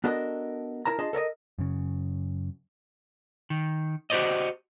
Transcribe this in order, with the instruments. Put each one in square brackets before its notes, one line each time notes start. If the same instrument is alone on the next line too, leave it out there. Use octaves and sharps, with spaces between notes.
[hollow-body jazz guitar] B3 D4 F#4 A4 A#4 D#5
E4 A#4 A5 A#5
D4 F4 G#4 D#5 A5
A4 A#4 D5 D#5
[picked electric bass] F#2 C#3
[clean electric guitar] D#3
F#4 G4 A#4 C5 D5 D#5